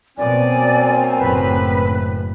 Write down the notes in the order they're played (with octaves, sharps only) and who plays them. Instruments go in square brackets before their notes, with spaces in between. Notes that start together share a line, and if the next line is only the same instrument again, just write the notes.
[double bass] B2 [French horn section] F#3 A#3 C4 [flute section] D5 [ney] G#5
[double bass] F#1 A2 [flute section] B4